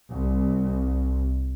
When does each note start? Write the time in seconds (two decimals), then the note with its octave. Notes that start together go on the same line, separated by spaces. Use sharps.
0.11 C2